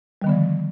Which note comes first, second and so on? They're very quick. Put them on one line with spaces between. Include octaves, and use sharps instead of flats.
G3 D#3 B3 D3 F3